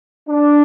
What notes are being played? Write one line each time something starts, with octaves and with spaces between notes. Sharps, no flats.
D4